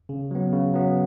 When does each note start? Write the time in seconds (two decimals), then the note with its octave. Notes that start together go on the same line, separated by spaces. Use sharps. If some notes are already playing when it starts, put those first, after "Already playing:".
0.09 C#3
0.31 F#3 B3
0.52 C#3
0.74 F#3 B3